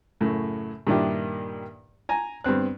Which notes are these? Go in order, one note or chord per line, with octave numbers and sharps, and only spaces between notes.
F#2 A2 C#3
G2 A#2 D#3 D4 E4 G4
G#5 A#5
G2 B3 C4 F#6